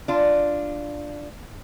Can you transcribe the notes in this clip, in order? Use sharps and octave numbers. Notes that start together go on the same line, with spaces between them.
D4 F4